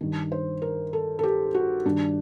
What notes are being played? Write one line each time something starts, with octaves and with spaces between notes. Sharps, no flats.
G2 D#3
C5
A#4
A4
A4
G4
F#4
G2 D#3 D4